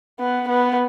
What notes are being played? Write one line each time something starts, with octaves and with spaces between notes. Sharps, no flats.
B3
B3